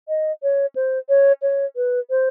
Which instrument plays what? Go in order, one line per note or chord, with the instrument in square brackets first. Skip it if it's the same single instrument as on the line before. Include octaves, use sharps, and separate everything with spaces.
[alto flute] D#5
C#5
C5
C#5
C#5
B4
C5